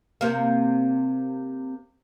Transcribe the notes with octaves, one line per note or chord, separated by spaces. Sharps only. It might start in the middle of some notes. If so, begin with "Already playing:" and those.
C3 A#3